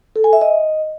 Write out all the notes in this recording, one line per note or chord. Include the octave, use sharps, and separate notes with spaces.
A4
G#5
E5
D#5